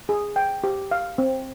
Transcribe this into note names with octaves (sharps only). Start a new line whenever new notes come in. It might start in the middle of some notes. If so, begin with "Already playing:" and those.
G#4
G5
G4
F5
C4